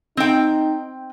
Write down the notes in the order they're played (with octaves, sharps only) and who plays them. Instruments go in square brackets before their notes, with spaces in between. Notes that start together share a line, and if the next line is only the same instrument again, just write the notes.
[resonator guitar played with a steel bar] C4 G5 [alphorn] D#4